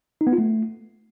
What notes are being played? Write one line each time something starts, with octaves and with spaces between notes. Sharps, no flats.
D#4
B3
F4
A3